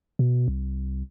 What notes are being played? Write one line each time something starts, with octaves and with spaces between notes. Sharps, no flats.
B2
C2